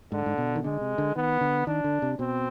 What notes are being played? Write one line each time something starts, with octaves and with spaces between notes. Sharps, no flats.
G#2 D3
G#2
B2
D#3
D3 G#3
C3
D3
D#3 B3
D3
D#3 D4
D3
C3
B2 C4